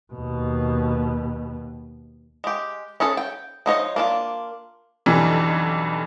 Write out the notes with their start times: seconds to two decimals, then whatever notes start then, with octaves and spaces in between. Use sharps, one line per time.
0.13 D#2 B2
2.44 G#3 G4
3.00 C#4 G#4 A4 C#5
3.17 G5
3.66 F3 D#4 C#5 D#5
3.96 A#3 D4 F4
5.06 B1 F2 D3 E3 G3